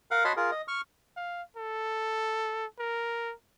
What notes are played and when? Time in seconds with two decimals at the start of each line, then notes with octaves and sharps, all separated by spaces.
0.11 A#4 F5 F#5
0.25 F#4 C#5 D#5 A5 B5 C6
0.37 F4 G#4 A#4
0.52 D#5
0.68 C#6 F6
1.17 F5
1.57 A4
2.79 A#4